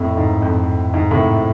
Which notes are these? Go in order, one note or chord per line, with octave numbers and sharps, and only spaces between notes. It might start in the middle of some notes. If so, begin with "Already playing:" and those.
Already playing: F2 A2
G#2
F2
G#2
A2 C3